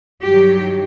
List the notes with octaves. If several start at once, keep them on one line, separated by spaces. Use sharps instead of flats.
G2 D#3 F#3 G4